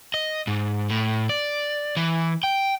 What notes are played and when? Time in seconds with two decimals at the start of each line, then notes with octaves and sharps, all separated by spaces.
0.14 D#5
0.47 G#2
0.90 A2
1.30 D5
1.97 E3
2.43 G5